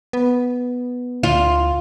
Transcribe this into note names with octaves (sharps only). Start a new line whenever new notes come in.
B3
D2 F4